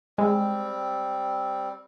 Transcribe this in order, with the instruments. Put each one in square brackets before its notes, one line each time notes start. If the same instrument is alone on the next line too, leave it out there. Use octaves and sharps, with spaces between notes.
[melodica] G3 C4 [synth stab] G#3